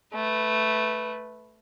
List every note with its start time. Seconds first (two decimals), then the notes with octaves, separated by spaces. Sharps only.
0.14 A3 B4